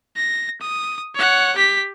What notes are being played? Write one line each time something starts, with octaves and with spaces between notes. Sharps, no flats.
A#6
D#6
C#5 F#5
G4 B6